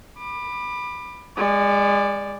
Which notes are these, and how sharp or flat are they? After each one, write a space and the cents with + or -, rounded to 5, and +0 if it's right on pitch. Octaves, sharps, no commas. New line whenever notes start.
B5 +0 D6 +30
G#3 -30 D5 +0